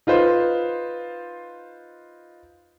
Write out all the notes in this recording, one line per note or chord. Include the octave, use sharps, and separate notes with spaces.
D#4 F4 B4 C5